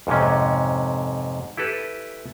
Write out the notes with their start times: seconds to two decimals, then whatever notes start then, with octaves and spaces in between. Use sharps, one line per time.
0.07 F2 G#2 C3 C#4
1.57 E4 G4 A4 B4